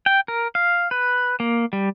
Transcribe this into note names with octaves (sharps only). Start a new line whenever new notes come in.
G5
A#4
F5
B4
A#3
G3